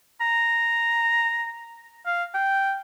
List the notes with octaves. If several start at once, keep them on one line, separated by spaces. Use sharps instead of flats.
A#5
F5
G5